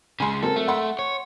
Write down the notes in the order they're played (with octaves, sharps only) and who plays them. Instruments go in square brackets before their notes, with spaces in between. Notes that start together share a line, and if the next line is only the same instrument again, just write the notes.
[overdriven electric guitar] C#3 G#3 [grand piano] G#5 C6
[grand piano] F#3 C4 A#4 [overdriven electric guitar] A4
[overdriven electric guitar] A3
[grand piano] F#5 C6
[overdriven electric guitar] C#5